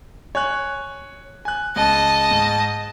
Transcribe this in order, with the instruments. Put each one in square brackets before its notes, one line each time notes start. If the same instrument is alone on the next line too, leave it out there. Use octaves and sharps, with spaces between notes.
[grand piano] C#5 G#5 F#6
G#5 F#6
[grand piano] C#2 [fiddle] D#5 A5
[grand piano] G#2